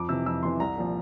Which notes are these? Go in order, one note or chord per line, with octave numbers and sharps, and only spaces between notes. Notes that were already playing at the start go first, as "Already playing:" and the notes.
Already playing: F2 D6
C3 E3 E6
F2 E6
C3 E3 C6
C2 A#5
A#2 F3